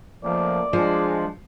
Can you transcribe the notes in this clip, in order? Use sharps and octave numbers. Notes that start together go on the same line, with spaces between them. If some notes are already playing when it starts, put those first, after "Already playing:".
C#2 F3 A3 A#3 D5
F3 G#3 D4